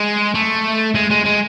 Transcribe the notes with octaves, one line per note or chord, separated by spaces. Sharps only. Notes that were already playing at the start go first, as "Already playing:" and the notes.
Already playing: G#3
A3
G#3
G#3
G#3